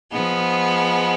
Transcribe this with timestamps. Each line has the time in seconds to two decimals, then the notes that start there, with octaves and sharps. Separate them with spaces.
0.13 F3 G#3 B3